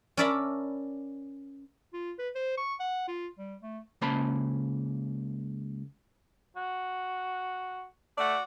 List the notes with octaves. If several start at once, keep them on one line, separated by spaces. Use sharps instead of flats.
C#4 A#4 D5 E5 A5 B5
F4
B4
C5
C#6
F#5
F4
G3
A3
C#2 A#3 C#4 C5 A5 B5
F#4
A3 F#4 D5 F#5